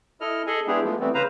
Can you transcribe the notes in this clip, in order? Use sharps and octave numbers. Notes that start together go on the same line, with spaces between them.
E4 A4 D#5 F6
G#4 A4 D#5 G#5
G#3 B3 D4 E4 G4 G#4
F3 G#3 A3 B3
E3 G3 A3 B3 C4
C#3 B4 C5 F5 A#5